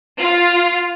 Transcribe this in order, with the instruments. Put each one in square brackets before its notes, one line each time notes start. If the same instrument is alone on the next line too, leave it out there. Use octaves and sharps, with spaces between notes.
[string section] F4